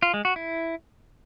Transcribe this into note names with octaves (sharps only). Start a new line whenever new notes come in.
F4
G#3
F#4
E4